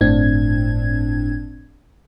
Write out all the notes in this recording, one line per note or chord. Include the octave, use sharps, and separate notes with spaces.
G1 A2 C4 D4 G#6